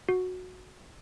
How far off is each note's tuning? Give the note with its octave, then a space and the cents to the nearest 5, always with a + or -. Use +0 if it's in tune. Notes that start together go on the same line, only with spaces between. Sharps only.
F#4 -15